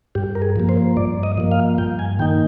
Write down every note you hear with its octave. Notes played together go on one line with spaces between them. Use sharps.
G2 G4
A#4
G#4
F3 A#3
C5
G2 D5
D#5
F3 A#3
F5
G2 G5
G#5
D#3 A#3 D#4 G5